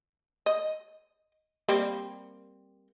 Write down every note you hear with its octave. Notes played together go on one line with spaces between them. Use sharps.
D#5
G3 A#3 C4